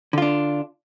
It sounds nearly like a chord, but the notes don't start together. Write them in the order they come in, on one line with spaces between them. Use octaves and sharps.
D3 F4 D4